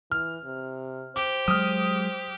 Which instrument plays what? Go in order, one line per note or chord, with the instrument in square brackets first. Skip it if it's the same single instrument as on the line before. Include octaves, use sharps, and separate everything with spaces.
[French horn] E3 [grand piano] F6
[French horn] C3
[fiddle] G4 [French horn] C5 [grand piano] D6
[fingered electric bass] F#3 G#3 [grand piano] D#6 F6